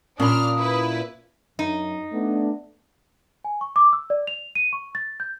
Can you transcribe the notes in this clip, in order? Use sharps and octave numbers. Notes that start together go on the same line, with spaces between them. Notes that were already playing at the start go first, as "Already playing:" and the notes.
A#2 C#4 D4 B5 D#6 F6
E4 B4
F#2 D#4
A3 B3 D4
G#5
C#6
D6
E6
D5
F7
D#7
C#6
A6
G6